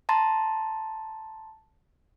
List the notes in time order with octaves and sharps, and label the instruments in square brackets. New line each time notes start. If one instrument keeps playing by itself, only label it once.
[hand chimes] A5 A#5 C6 A6